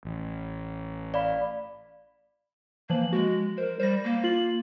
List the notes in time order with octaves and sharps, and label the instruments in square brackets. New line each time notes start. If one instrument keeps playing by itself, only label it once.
[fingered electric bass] A1
[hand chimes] D5 F5 B5
[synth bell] E3 F3 F#7 [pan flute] A#3
[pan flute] G#3 [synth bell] F#4
[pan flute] A#4 [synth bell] C5
[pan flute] G3 [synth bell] C5 A#6
[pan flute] A#3
[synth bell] F4 C7 F#7